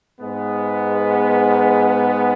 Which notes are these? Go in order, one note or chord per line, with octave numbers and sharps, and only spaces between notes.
G#2 G#3 B3